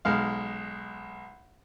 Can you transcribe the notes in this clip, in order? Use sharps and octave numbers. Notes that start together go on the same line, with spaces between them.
B1 G#3 F5